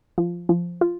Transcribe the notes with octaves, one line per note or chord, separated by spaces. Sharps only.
F3
F3
F4